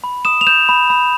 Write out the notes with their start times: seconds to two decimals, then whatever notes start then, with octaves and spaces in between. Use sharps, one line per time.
0.04 B5
0.25 D#6 E7
0.41 F7
0.47 G6 E7
0.69 B5
0.90 B5